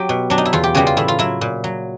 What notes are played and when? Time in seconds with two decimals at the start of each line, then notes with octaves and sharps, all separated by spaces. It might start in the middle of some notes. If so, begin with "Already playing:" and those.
Already playing: F#3 G4
0.09 B2
0.30 F#3 D4
0.38 D#4
0.45 E4
0.53 E2 F4
0.63 G4
0.75 C#3 E3 G3 F#4
0.87 F4
0.97 A2 E4
1.08 F4
1.19 F#3 E4
1.41 A#2
1.64 F#3